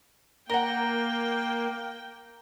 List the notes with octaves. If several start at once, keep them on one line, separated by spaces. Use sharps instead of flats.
A#3 A#4 F#5 G5 A#5 A#6 G7